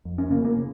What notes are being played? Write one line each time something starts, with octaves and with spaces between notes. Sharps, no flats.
F2
C#4
C#3 A#3
A#3
C#3